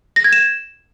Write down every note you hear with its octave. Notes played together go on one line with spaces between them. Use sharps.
A#6
G#6
E7